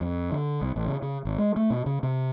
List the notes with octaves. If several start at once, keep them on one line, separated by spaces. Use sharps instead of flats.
F2
D3
C2
A1
C#3
C#3
G#1
G#3
A3
B2
C#3
C3